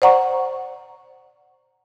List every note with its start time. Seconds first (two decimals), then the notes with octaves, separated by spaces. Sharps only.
0.02 C5 D5 F#5 A#5 C#6